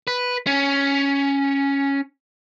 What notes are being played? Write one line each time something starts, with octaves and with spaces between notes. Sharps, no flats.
B4
C#4